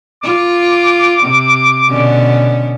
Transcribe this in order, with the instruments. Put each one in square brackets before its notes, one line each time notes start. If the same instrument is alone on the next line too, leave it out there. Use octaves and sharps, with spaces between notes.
[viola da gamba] F4 [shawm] D6
[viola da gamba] C3
B2 D3 C#4